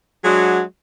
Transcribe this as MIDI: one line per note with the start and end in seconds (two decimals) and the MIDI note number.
0.24 0.61 54
0.24 0.61 56
0.24 0.61 62
0.24 0.61 66
0.24 0.61 68